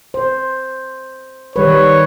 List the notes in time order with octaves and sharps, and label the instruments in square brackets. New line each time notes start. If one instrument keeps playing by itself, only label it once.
[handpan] C5
[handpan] D#3 G3 B4 [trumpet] C#5